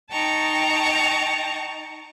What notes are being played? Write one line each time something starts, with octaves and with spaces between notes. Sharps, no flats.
D#4 G5 A5 A#5 C#6